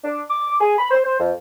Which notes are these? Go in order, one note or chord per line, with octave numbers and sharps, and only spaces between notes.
D4
D6
G#4
B5
C5
C5
F2